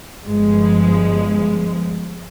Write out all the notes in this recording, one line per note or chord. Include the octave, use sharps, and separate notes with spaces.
G1 G2 F3 G#3